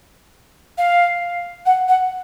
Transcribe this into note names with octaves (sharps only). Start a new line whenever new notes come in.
F5
F#5
F#5